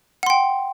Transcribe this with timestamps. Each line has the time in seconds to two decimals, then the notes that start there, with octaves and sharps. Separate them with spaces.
0.23 F#5
0.26 C6
0.30 G5